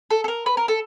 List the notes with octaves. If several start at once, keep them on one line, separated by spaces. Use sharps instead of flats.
A4
A4
A#4
B4
A#4
A4